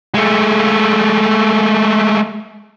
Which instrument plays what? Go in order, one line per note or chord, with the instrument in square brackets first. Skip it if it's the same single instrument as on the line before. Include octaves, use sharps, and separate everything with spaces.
[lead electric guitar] G#3 A3